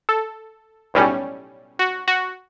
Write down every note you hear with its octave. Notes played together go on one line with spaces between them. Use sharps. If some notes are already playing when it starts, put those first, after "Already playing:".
A4
B1 A2 G3 C#4
F#4
F#4